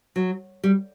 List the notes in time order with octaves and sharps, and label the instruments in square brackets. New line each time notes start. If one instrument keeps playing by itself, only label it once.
[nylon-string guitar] F#3
G3